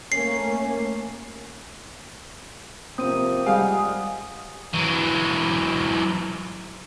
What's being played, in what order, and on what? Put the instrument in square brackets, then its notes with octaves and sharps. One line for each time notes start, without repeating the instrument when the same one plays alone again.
[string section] A3 A#3 C#4 [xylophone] C7
[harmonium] C3 F3 A#3 [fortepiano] C4 [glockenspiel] D#6 D#7
[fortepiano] G3 F5 [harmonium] G#3 F#5 [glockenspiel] G#5 [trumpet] D#6
[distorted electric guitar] E3 F#3